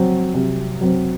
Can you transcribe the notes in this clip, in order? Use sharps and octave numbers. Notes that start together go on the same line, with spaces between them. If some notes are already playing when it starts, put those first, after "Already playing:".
Already playing: F#3 C4
C3
F#3 C4